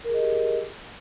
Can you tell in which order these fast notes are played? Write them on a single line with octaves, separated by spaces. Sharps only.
A#4 G#4 D#5 G4